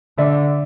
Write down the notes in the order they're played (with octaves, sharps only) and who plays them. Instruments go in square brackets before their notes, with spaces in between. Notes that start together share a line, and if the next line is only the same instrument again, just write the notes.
[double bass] D3 [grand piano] D5 E5